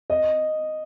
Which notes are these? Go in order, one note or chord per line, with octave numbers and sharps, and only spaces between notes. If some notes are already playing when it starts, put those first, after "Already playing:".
D#5